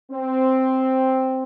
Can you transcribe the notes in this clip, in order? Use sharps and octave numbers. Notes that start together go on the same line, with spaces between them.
C4